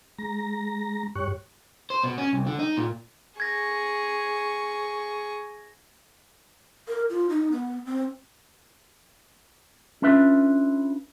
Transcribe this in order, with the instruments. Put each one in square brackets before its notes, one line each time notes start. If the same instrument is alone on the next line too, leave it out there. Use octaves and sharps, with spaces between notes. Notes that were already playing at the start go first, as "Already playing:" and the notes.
[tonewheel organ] G#3 A#5 A#6
G2 G4 C#5 C#6 F#6
[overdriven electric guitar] C5
B2
C#4
C2
D3
D#4
A#2
[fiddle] G#4 C#6 [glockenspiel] G#6 A#6
[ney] A#4
F4
D#4
B3
C4
[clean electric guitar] C#4 D4 F4 B4 E5